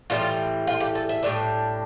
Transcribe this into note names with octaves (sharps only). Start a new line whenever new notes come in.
A2 E3 G3 F4
F4
G4
A4
E5
A2 G3 D4